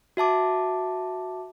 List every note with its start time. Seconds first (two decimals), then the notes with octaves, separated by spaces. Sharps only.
0.17 F#4 E5 A5 D6